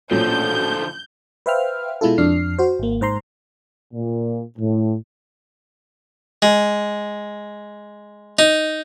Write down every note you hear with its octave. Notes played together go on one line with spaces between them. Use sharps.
A1 A#2 D3 F3 F#3 A4 G6
B4 C5 E5 F5 G5 F6
B2 G#3 E4 F4 A4
F2 D4 F6 C7
F#4 C5
G#1 A#3
G#2 C5 A#5 C6
A#2
A2
G#3
D#4